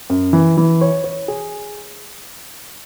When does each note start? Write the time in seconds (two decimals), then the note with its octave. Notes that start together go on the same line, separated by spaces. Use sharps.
0.10 F#2
0.33 E3
0.57 E3
0.81 C#5
1.04 C#5
1.28 G#4